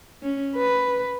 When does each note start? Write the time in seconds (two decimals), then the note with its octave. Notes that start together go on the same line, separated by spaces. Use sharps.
0.22 C#4
0.56 B4